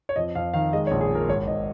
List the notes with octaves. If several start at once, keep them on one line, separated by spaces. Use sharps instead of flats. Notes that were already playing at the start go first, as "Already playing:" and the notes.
C#5
F2 D#5
F2 F5
D#3 F5
G#3 D#5
C#5
A#1
G#4
A#2
A#4
G#1 C#5
G#1 D#5